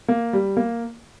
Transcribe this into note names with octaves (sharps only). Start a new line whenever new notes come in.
A#3
G3
A#3